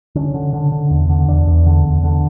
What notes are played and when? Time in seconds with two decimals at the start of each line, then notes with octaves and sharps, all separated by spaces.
0.15 D3 C#4
0.34 D3
0.53 D3
0.72 D3
0.91 E2
1.09 D3
1.28 E2 D4
1.47 E2
1.66 D3
1.84 E2
2.04 D3